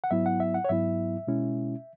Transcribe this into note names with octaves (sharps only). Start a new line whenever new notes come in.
F#5
G#2 F#3 B3 E4 E5
F#5
E5
F#5
C#5
G#2 F#3 B3 E4 E5
B2 G#3 C#4 E4